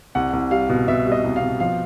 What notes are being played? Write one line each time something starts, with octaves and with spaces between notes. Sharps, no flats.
C2 F#5
C2
G3 F5
B2
B2 E5
G3
D#5
C2
F5
B2
F3 F5